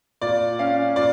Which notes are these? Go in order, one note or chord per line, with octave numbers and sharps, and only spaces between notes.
A#2 D5
C#4 F5
A#2 D5